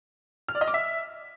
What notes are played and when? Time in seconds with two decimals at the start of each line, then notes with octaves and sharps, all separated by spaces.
0.48 F6
0.55 D5
0.61 D#5
0.68 D6
0.74 E5